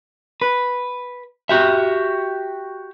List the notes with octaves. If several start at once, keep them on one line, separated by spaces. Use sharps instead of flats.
B4
F#4 G4 E5